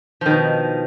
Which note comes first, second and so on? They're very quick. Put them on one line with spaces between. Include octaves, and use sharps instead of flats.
F3 D#3 B2